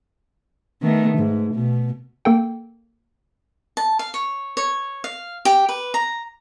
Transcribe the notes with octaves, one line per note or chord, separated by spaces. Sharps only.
D#3 A3 B3
G#2
B2
A#3 A4 G5
A5
F5
C#5
C#5
F5
G4
B4
A#5